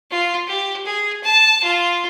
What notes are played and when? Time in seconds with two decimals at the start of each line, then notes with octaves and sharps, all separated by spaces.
0.11 F4
0.47 G4
0.85 G#4
1.24 A5
1.63 F4